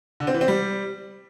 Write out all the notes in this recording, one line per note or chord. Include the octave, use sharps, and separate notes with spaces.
D3
C4
E3
C4
G3